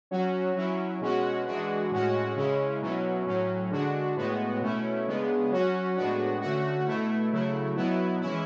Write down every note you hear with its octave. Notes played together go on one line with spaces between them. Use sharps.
F#3 C#4 F#4
F#3 C#4 E4
B2 G#3 C#4 F#4
E3 G#3 D4 F#4
A2 G#3 C#4 F#4
C#3 G#3 C#4 E4
B2 F#3 C#4 E4
A2 F#3 C#4
D3 G#3 D4 F#4
A2 G#3 B3 F#4
B2 A3 C#4 E4
C#3 G#3 B3 D4
F#3 C#4 F#4
A2 G#3 B3 D4 F#4
D3 A3 C#4 F#4
B2 A3 E4
C#3 F#3 A3 E4
B2 F#3 B3 E4
E3 G#3 C#4 E4